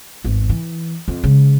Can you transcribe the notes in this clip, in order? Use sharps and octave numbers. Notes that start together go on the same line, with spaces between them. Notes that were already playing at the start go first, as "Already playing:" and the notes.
G#1 E2
E3
F2
C#3 G#3